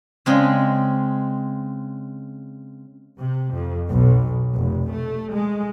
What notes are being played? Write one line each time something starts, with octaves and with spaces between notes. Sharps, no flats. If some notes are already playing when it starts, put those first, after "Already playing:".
C#3 G#3 C4
C3
F2
B1
F1
A3
G#3